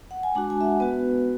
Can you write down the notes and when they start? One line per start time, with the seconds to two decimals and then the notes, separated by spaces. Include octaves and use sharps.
0.11 F#5
0.23 G#5
0.35 G#3 D4 F#4 A5
0.50 G#5
0.61 E5
0.65 F#5
0.80 B3 F#4 B4